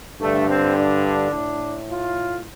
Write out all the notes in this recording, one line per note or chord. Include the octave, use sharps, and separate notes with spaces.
G2 D3 A3
C4
D4
A2
F4